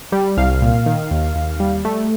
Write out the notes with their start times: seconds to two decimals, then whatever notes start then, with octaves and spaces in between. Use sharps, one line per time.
0.12 G3
0.37 C2 F5
0.62 A#2
0.86 D#3
1.11 D#2
1.35 D#2
1.60 G3
1.85 A3